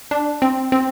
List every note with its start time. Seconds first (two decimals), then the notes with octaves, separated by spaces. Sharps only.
0.11 D4
0.42 C4
0.72 C4